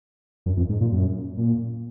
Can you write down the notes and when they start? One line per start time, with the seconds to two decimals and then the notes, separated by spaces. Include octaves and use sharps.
0.46 F#2
0.57 F2
0.69 G#2
0.81 A#2
0.92 F#2
1.38 A#2